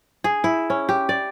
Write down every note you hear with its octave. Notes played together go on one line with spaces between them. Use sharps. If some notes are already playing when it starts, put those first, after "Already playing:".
G#4
E4
C#4
G4
D5